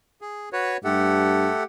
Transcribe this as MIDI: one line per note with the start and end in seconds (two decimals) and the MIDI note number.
0.21 0.49 68
0.53 0.77 66
0.53 0.77 71
0.53 0.77 73
0.84 1.50 43
0.84 1.64 57
0.84 1.63 67
0.84 1.64 69
0.84 1.63 78